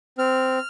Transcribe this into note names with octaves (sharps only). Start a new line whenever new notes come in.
C4 F6